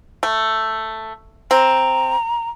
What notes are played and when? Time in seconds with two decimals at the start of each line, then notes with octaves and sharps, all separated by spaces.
0.23 A3
1.51 C4 A#5